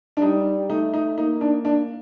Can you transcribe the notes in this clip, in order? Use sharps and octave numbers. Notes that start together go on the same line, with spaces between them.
D4
G3 D#4
A3 D#4
D#4
A#3 D#4
D4
D4